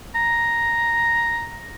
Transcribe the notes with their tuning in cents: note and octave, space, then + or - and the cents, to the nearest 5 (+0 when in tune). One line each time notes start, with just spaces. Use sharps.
A#5 +0